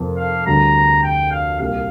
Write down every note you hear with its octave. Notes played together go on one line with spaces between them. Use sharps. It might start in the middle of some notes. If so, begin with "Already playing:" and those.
Already playing: F1 F2 F3 A#4
F5
D2 D3 G3 C4 A#5
G5
F5
C2 A#2 A#3 G4 F5